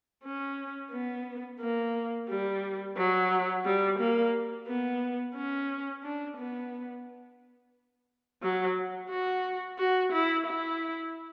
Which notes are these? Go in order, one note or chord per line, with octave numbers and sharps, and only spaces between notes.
C#4
B3
A#3
G3
F#3
G3
A#3
B3
C#4
D4
B3
F#3
F#4
F#4
E4
E4